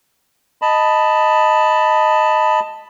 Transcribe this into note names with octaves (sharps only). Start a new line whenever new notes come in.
D#5 A5 B5